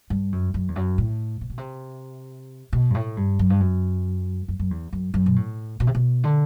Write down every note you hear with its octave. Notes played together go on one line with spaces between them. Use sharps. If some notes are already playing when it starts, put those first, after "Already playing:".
G2
F#2
F#2
E2
F#2
A2
C3
B2
C3
B2
G2
A2
G2
F#2
G2
F#2
F#2
F#2
E2
F#2
F#2
B2
A2
B2
C3
B2
D3